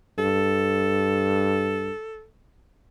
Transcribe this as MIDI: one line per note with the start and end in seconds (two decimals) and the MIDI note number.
0.18 1.90 43
0.18 2.25 69